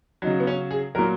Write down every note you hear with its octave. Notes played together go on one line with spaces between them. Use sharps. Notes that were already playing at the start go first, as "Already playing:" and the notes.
C#3 F#3 D#4
B3
C#4
G#4
A#2 F#3 A#4